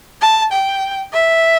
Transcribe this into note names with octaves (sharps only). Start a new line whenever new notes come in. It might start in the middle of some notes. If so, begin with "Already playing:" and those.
A5
G5
E5